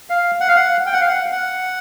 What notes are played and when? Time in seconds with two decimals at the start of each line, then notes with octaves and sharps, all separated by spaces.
0.10 F5
0.40 F#5
0.48 F5
0.56 F#5
0.87 G5
0.93 F#5
1.01 F5
1.08 F#5
1.32 F#5